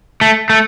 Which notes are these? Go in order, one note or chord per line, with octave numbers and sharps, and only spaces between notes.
A3
A3